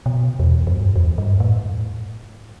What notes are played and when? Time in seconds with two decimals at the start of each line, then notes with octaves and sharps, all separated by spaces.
0.06 B2
0.39 E2
0.67 E2
0.72 G2
0.96 E2
1.18 G2
1.40 A2